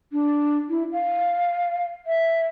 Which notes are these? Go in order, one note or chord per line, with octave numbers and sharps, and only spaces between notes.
D4
E4
F5
E5